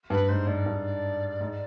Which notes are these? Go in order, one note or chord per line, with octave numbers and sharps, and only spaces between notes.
G2 B4
G#2 C5
G#2 D5
G2
G#2